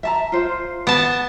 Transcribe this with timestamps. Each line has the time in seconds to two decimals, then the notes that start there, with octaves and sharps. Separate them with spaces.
0.03 E5 A5 A#5
0.32 F4 C5
0.87 B3 A5